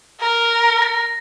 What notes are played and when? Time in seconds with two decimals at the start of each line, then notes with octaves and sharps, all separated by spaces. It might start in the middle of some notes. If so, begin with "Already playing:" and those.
0.20 A#4
0.82 A#6